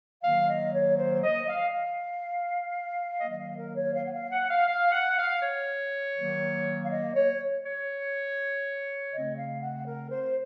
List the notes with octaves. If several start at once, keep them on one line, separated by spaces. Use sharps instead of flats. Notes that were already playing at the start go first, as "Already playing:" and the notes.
D#3 F#3 A#3 F5
D#5
C#5
C5
D#5
F5
F5
D#3 F#3 A#3 D#5
D#5
F5
A#4
C#5
F5
F#5
F5
F#5
F5
F5
F#5
F5
C#5
D#3 F#3 A#3
F5
D#5
C#5
C#5
C#3 A3 C4 D#5
F5
F#5
A#4
C5